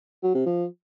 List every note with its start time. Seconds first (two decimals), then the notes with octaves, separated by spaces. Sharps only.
0.23 F#3
0.35 C3
0.46 F3